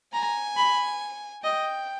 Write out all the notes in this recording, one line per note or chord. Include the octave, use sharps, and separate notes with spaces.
G#5 A#5
B5
D#5 G5